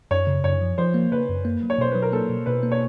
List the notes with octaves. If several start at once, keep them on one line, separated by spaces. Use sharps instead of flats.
F#2 C#5
C#3
F#2 C#5
F3
F3 C5
A#3
C#3 B4
F#2
A#3
F#3
C#5
B2 C5
F#3 B4
A#4
A#3 A4
B2
B2 B4
A#3
C#5